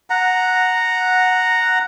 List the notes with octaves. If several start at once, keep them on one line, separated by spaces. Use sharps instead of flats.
F#5 A#5